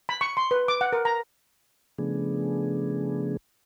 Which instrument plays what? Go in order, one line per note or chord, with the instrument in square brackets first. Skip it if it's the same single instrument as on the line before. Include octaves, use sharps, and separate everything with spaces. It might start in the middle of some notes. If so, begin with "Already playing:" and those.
[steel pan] B5
C#6
C6
B4
D6
F#5
A#4
A#5
[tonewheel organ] C#3 F3 A3 B3 D4 G#4